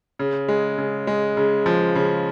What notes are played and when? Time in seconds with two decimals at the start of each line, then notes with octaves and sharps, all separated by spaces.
0.19 C#3
0.49 G#3
0.78 C#3
1.07 G#3
1.37 C#3
1.66 F3
1.95 C#3